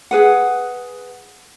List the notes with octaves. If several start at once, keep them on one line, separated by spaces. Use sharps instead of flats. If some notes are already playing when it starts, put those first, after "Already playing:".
G#4 B4 F#5